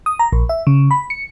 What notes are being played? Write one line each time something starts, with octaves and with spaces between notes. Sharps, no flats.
D#6
A#5
A#1
E5
C#3
B5
C#7